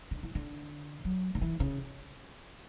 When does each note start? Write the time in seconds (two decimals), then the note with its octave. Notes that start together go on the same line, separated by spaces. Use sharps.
0.11 D3
0.23 E3
0.35 D3
1.05 F#3
1.35 D3
1.42 E3
1.60 C#3